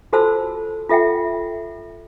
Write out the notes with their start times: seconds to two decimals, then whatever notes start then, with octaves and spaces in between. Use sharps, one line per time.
0.13 F4 F#4 A4 C5 A5 E6
0.89 F4 A4 E5 F#5 G5